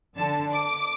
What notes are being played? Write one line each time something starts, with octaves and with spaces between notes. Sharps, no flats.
D3 A5
D6